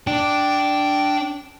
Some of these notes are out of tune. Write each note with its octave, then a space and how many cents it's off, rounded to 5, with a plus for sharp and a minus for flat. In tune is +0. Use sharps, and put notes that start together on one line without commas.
D4 +0 G5 -10